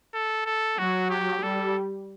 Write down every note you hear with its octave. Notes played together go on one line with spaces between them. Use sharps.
A4
A4
F#3 F#4
G4
G3 A4